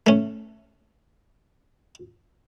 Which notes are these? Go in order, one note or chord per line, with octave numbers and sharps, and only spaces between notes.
A3 C#4